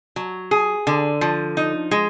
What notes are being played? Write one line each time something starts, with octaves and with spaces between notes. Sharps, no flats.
F#3
G#4
D3
F3
D#4
G#3